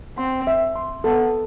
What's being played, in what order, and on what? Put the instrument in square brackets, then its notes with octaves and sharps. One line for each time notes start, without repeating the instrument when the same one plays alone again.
[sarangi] C4 [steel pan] C6
[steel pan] E5
C6
[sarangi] B3 [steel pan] A4